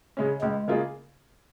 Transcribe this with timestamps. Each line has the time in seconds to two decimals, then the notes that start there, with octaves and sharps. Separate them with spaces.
0.17 C#3 G#3 C#4
0.42 C#2 G#3
0.68 C#3 A#3 F4 G#4